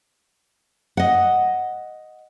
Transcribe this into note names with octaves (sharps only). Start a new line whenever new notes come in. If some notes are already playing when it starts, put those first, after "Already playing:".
D#5 F#5